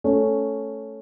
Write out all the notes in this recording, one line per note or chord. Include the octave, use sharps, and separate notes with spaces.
A3 C#4